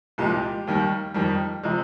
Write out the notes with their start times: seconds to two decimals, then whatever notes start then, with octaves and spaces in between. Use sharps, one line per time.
0.18 C2 A#2 F3 G#3 G4
0.67 D#2 D#3 G3
1.14 F2 D#3 G3
1.63 C3 F3 G#3